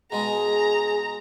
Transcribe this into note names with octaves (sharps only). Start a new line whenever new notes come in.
B2 G#3 G#4 A#5